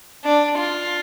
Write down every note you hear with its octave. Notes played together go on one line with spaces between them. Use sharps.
D4
F4